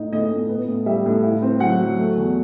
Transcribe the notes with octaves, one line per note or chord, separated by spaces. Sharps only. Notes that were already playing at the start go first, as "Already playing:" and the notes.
Already playing: A2 D#4 D#5
A2 D#5
A2
B3
A2
G3 E5
A2
E4
C4
F#3 F#5
F#3
A3
E2